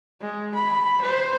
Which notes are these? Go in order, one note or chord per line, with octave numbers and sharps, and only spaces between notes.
G#3
B5
C5